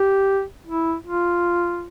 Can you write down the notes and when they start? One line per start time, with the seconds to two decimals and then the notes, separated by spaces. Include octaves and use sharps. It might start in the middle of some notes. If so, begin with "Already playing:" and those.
Already playing: G4
0.67 E4
1.07 F4